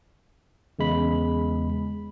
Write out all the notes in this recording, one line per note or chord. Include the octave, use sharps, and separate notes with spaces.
E2 C#3 G#3 B5